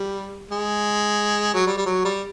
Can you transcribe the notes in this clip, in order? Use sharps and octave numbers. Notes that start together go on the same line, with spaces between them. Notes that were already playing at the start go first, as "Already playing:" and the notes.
Already playing: G3
G#3
F#3
G3
G3
F#3
G3